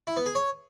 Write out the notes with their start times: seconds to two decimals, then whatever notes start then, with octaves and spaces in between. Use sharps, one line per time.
0.07 E4
0.17 B3
0.26 G#4
0.35 C#5